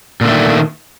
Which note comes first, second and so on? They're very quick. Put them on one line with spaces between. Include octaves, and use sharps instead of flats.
A#2 D3 A3 D#3